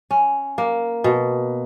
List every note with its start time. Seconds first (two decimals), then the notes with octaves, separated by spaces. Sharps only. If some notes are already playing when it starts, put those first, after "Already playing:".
0.11 C#4
0.58 A#3
1.04 B2